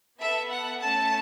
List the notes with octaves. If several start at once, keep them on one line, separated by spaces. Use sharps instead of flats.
B3 A4 E5
F#5
A3 C#4 A4 A5